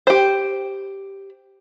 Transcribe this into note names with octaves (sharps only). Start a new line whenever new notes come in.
G4 C5